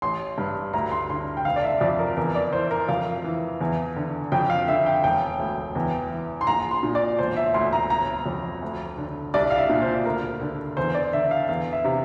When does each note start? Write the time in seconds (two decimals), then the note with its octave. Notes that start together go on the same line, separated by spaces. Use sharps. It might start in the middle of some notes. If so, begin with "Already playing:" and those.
0.02 A1 C6
0.38 G2
0.73 D2 A#5
0.91 C6
1.10 D3 C6
1.37 G5
1.45 F1 F5
1.56 D5
1.63 E5
1.81 F2 D5
1.99 A#4
2.17 E2 A#4
2.35 D5
2.53 E3 C5
2.71 A#4
2.88 F2 F5
3.24 E3
3.61 E2
3.96 D3
4.32 F2 G5
4.50 F5
4.68 D3 E5
4.86 G5
5.04 E1 G5
5.39 D2
5.75 E2
6.11 E3
6.41 C6
6.47 A#1 A#5
6.71 C6
6.83 A#2
6.95 D5
7.19 E1 C5
7.37 E5
7.54 D2 C6
7.73 A#5
7.90 G1 A#5
8.26 F2
8.62 D2
8.98 D3
9.34 C2 D5
9.51 F5
9.58 E5
9.69 A#2
9.82 C5
10.05 D2 A#4
10.41 D3
10.77 E2 C5
10.94 D5
11.13 D3 E5
11.31 F5
11.49 E2 F5
11.73 E5
11.84 C3